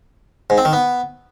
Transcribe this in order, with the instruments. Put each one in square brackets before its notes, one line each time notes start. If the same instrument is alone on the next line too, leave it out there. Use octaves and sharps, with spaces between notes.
[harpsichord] G#2
C4
D#3
B3